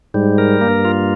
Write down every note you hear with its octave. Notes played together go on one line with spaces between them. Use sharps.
G#2 G3
A#4
G2 A#3
F4